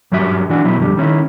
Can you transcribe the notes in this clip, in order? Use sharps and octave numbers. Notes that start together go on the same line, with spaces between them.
G2 F#3 G3 F#4 E5
E3 D4 F#4
B2 F#3 E4
F2 D3 G3
D#3 C#4 E4